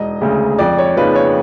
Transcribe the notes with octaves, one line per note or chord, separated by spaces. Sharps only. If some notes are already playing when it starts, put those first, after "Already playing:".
Already playing: E1 D#5
D2 C#3
F2 D5
C#5
C#3 F3 A#3 D#4 B4
C#5